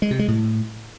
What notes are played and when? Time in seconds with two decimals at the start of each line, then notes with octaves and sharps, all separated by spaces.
0.02 G#3
0.11 C3
0.19 G#3
0.28 A2